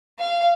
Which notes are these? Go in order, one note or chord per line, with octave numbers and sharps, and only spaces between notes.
F5